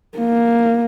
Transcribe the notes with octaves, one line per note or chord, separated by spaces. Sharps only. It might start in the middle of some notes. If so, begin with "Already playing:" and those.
A#3